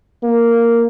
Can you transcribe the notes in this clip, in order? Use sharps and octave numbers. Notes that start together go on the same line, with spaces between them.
A#3